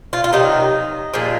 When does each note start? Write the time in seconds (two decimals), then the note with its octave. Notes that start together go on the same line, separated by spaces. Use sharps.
0.13 F4
0.24 F4
0.33 C3 D#3 F#3 D#4
1.14 A#2 F3 G#3